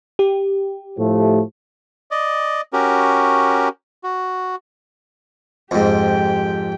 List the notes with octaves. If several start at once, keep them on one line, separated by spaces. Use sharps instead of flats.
G4
A2 F3 A3
D5 D#5
C#4 F#4 G4 A#4
F#4
F2 G#2 G4 G5